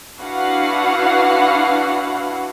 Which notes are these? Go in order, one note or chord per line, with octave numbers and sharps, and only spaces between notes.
D4 E4 F#4 B4 F5 F#5